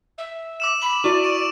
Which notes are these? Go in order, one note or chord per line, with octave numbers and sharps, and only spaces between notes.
E5
D6 E6 E7
B5 F#7
E4 F#4 D5 C#6
C#6 D7